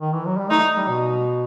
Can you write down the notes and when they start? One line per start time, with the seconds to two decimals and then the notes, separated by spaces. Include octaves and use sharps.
0.01 D#3
0.13 E3
0.25 F#3
0.38 G3
0.50 A3 D#4
0.76 G3
0.88 B2